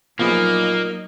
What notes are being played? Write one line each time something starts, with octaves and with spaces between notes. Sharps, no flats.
A#2 F3 F#3 A#3 B3 D#4 G#4 D#5